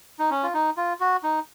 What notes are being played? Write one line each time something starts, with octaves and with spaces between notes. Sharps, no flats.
D#4
C#4
F4
D#4
F4
F#4
D#4